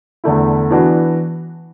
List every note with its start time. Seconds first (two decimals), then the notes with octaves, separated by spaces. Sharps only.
0.24 E2 D3 A3 E4
0.70 E3 B3 D4 F#4